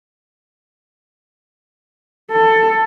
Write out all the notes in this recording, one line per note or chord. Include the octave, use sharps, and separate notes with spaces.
A4